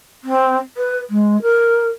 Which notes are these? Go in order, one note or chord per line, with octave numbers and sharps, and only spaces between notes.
C4
B4
G#3
A#4